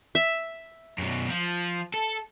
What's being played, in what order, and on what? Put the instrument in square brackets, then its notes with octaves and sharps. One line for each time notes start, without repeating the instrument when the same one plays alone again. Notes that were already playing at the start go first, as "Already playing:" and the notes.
[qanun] E5
[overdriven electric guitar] F#2 B2
F3
A4